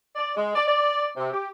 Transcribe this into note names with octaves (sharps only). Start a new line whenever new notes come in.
D5
G#3
D5
D5
C3
G4